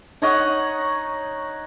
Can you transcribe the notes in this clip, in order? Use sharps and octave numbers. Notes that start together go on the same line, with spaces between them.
D#4 C#5 D#5 F#5